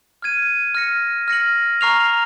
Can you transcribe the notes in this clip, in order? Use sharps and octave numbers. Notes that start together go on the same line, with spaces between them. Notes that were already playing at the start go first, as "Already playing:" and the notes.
F6 G#6 D#7
F6 A#6 C#7
F6 A#6 C#7 F#7
A#5 C#6 F6 C7 F7